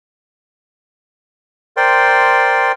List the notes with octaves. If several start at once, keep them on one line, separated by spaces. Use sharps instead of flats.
A#4 C5 D5 G5 C6